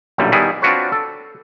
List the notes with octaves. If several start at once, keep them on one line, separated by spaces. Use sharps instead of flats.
B1 F#2 A#2 D3 G3
D#3 G3 B3 E4 G#4
C4 D4 F4 F#4 B4 C#5
A4